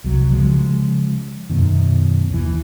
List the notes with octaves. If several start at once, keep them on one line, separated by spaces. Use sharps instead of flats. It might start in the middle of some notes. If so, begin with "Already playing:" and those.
C2 F#3
C#3 F3 F#3 G#3
F#2 B2 D#3
D#2 E3